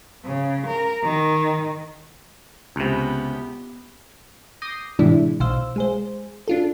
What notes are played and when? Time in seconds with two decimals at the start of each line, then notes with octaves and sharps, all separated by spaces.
0.23 C#3
0.66 A#4
1.03 D#3
2.76 C#2 C3 B3 G4
4.62 D6 D#6 G6 A#6 C7 D#7
4.99 A2 C3 E3 G#3 D4 E4
5.40 B1 B2 C5 F5 E6
5.76 G#3 G#4 C5
6.48 D4 F4 A4